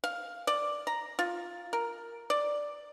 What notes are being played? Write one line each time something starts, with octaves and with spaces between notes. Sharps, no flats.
F5
D5
A#5
F4
A#4
D5